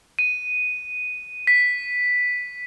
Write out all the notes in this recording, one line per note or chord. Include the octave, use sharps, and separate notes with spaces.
D#7
B6